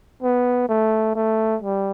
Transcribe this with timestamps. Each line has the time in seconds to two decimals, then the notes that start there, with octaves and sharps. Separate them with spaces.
0.23 B3
0.69 A3
1.15 A3
1.62 G3